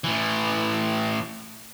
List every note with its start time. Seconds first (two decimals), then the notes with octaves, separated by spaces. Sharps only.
0.04 A2 E3